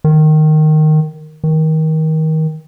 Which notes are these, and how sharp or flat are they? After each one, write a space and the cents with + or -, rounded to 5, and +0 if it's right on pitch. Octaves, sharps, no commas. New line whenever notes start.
D#3 -10
D#3 +25